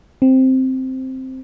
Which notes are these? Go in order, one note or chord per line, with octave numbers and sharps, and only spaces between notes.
C4